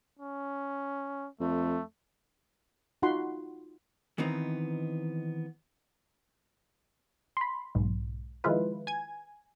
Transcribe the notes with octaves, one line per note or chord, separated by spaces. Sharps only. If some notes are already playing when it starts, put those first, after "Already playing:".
C#4
F2 A3
D#4 F4 F#4 F#5 B5 C6
D#3 E3 B3 C4 D#4
B5 C6
B1 G#2
D#3 F3 G#3 E4 F4 B4
G#5 G#6